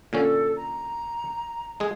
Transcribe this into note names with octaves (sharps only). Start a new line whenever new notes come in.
A#2 D3 C#4 A4
A#5
G#3 G#4